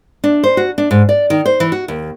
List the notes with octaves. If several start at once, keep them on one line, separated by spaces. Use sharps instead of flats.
D4
C5
F#4
D4
G#2
D5
D#3
C5
E3
F#4
D#2